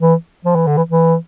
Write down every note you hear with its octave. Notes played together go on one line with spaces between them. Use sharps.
E3
F3
E3
D3
E3
E3